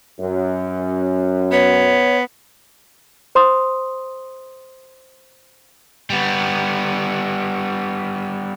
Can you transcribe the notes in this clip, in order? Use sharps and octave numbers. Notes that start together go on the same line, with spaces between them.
F#2
B3 C#5
C5 C6 D#6
G3 B3